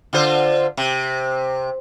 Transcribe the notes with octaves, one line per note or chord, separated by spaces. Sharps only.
D3 F4 C5
C3